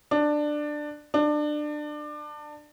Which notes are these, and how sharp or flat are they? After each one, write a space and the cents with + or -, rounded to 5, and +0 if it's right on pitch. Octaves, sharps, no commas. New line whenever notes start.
D4 +15
D4 +25